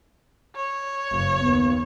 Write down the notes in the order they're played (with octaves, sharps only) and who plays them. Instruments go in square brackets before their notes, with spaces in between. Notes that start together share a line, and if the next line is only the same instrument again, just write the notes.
[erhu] C#5
[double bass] F#1 G2
[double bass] D#2 [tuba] B3